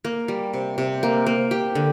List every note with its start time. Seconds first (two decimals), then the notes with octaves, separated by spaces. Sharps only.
0.05 A#3
0.28 G3
0.54 C3
0.78 C3
1.03 A#3
1.27 A#3
1.51 G4
1.75 D3